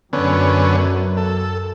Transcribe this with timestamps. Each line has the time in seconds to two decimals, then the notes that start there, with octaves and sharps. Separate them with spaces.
0.13 F#2 D3 B3 C#4
1.17 A4